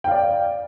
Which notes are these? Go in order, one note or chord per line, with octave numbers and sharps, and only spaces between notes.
D5 F5 G5